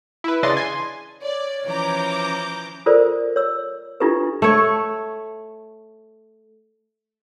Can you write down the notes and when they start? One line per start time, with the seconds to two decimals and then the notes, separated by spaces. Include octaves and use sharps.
0.24 E4 B4
0.43 C#3 E3 D4 D#5 C6 A6
0.57 G#5 C6
1.22 C#5 D5
1.67 E3 F3 C#4 A#5 D6 G6
2.86 F4 A4 A#4 C5 D5
3.36 C#5 E6
4.00 D4 E4 F4 G4 A4 B4
4.42 A3 C#5